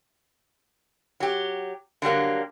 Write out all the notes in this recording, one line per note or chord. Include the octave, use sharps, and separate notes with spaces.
F#3 G4
D3 F#3 G3 A#3